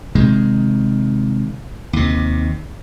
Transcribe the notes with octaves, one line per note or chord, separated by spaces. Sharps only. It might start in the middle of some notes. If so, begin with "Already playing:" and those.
C3 D#3 G#3
D#2 C3